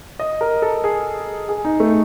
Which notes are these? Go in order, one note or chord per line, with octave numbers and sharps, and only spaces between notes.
D#5
A#4
A4
G#4
G#4
D#4
A3